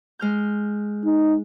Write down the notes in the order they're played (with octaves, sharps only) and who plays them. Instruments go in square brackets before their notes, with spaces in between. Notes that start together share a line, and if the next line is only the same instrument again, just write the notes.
[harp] G#3 F6 G6
[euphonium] D#4